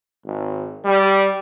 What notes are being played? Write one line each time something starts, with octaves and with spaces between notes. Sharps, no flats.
G#1
G3